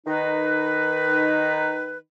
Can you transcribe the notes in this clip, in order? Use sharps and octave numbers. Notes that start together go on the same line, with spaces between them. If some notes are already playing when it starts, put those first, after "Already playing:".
D#3 D#4 B4